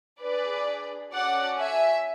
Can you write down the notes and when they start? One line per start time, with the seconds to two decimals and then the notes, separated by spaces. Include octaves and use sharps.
0.22 D4 G#4 B4 D5
1.13 C#4 F#4 A4 D5 F#5
1.58 E5 G#5